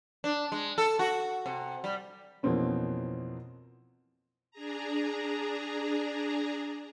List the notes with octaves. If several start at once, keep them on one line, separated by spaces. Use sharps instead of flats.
D4
G#3
A4
F#4
C3
G3
F2 B2 E3 A#3 C4 C#4
D4 G#4 A#5